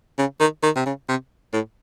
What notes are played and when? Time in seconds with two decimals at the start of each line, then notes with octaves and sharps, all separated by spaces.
0.18 C#3
0.40 D#3
0.63 D#3
0.76 C3
0.86 C#3
1.09 C3
1.53 A2